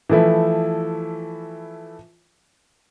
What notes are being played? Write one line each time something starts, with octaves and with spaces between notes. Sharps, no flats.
E3 F3 A3 E4